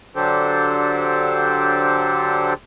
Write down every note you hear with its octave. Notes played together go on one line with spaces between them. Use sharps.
D3 F#3 D4 G4 A4 C5